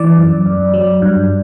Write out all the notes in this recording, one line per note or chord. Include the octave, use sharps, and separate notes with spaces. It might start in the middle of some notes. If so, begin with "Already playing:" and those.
Already playing: E3 D5
F#2
F#2
F#3
G2